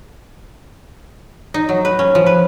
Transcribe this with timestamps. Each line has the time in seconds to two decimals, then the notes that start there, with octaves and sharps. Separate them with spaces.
1.54 D#4
1.69 F#3
1.85 B4
1.99 C#4
2.15 F3
2.26 B4